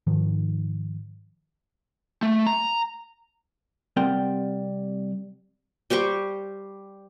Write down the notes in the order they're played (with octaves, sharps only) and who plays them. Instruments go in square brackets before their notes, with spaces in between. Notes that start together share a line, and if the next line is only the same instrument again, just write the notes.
[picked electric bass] G#2 D#3 F3
[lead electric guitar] A3
A#5
[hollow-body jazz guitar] C2 G3 C4 A#4 F#5 G5
[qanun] G3 G4 C5 C#6